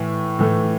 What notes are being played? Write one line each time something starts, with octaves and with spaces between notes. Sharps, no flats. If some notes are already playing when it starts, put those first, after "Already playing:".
Already playing: A2 E3 A3
A2 E3 A3